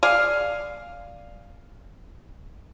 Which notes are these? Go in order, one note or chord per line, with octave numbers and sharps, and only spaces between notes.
G#4 D5 F5